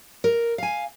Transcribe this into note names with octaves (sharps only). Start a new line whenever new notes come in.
A#4
F5 G#5